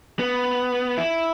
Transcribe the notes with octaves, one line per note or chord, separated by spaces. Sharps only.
B3
E4